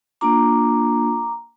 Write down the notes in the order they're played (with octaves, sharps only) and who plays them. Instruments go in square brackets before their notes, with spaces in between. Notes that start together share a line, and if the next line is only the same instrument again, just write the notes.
[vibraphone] A#3 D4 F4 A#5 D6